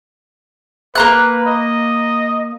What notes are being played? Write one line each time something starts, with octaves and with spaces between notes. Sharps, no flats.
A#3 B4 A#5 F#6
D#5